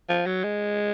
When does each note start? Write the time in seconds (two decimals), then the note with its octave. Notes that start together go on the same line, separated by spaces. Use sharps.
0.09 F3
0.26 F#3
0.44 G#3